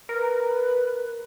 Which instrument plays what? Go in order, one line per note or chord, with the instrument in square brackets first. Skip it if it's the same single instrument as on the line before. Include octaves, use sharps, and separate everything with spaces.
[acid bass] A#4 [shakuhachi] B4